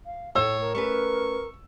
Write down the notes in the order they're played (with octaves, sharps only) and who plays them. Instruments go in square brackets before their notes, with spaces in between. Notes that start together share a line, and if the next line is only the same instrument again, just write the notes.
[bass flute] F5
[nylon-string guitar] A2 [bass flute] A3 [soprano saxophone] C#5 [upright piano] E6
[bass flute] A#4
[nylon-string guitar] A3 C#4 B4 [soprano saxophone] C#6